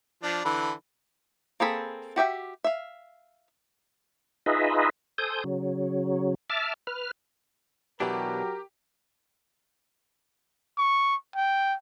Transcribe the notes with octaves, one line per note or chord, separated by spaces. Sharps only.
F3 D4
D3 E3 B5
A#3 C4 G#4 A4 B5
F#4 G4 E5 G5
E5 F5
D#4 F4 G#4 B4 D#5 E5
A4 C5 G#5 D#6 G6
C#3 F#3
E5 A5 D6 F6
B4 F6
B2 E3 F#3 D4 G4 A#4
C#6
G5